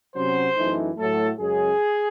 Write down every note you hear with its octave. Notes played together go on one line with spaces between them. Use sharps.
C3 F#3 C#4 C5
F#2 E3 A3 D#4
A2 F#3 A3 A4
F#2 C#3 G#3 C#4 G#4